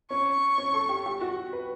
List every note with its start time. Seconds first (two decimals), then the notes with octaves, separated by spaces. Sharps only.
0.10 C#4 C#6
0.58 C#4
0.74 A4
0.89 G4
1.06 G4
1.21 F#4
1.53 B4